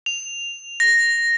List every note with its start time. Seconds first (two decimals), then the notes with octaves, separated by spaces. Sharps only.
0.06 F7
0.80 A#6